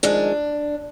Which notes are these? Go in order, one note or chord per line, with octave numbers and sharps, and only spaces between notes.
F2 D#3 G#3 D4